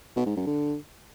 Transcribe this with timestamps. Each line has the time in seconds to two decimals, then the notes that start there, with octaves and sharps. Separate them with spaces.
0.16 B2
0.26 G#2
0.36 F#2
0.47 D3